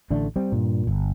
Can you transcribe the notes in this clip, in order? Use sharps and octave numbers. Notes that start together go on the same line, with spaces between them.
A1 D3 A3 D4
G3 C4
G2 A#2
G1